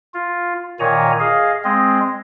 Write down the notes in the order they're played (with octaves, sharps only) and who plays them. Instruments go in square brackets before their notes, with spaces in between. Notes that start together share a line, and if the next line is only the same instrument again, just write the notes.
[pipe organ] F4
A#2 D#3 C#5 G#5 A#5
G#4 D#5 F5
G#3 C4 D#5